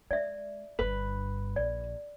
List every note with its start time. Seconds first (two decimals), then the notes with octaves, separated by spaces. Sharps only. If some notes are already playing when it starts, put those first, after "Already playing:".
0.11 G#3 D5 E5
0.79 G1 G2 B4
1.56 A#1 D5